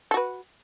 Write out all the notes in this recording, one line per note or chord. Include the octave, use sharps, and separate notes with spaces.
F#4 A4 B4